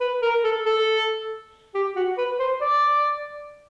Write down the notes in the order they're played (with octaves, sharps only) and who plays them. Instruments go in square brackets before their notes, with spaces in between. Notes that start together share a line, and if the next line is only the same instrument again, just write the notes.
[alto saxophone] B4
A#4
A4
A4
G4
F#4
B4
C5
D5